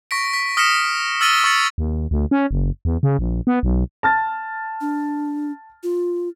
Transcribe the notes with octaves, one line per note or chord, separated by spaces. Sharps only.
C#6 A#6 B6 D7
B6
D#6 F6 A#6 B6 C#7 E7
E6 F6 A6 A#6 D#7 G7
C#6 D#6 E6 A6 C#7
D#2
D2
C#4
F#1
E2
C#3
A#1
B3
B1
A5 F6 A6
D4
F4